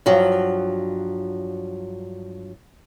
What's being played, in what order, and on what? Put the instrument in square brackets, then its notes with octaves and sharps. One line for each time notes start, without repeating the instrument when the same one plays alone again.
[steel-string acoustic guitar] G2 F3 F#3